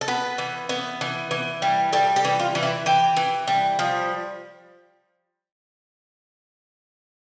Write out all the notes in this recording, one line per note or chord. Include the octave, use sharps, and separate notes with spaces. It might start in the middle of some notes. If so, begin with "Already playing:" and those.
A4
B3 B4
E3
B3
E3
E3
G3
G3 A4
G4
E3
F4
E3
E4
E3 G4
E3
G3
F3